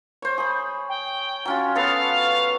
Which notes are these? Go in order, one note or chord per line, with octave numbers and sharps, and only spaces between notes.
C5 C#5
G#4 B5
G5
F#3 C#4 F4
B3 A4 B4 F5